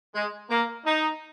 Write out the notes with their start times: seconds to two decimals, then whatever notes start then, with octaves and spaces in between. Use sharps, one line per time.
0.15 G#3
0.50 A#3
0.86 D#4